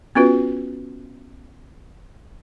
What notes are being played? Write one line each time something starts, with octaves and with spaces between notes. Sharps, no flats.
B3 C#4 F4 F#4 B4